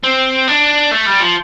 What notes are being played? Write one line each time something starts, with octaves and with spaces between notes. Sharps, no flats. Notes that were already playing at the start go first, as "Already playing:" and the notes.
C4
D4
A3
G3
F3